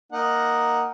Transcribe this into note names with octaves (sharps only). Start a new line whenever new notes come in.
A#3 D#4 F#5